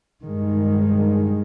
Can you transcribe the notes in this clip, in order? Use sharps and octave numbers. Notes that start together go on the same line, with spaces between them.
G2 D#3 G#3